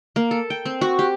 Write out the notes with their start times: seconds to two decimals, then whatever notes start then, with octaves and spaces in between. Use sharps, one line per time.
0.16 A#3
0.31 A4
0.50 G5
0.65 C4
0.81 F#4
0.99 G4